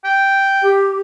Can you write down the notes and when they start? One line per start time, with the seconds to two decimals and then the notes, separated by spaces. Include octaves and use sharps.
0.04 G5
0.62 G4